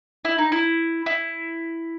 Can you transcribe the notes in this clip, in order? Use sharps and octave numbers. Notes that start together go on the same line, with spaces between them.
E4
D#4
E4
E4